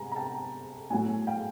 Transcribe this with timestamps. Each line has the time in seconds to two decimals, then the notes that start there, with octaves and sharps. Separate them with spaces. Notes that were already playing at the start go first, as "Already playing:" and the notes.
Already playing: C3 G#3 G#5 A#5 B5
0.12 A#5
0.16 G5 A5
0.90 A2 F#3 A3 F#5 G#5
1.27 F5 G5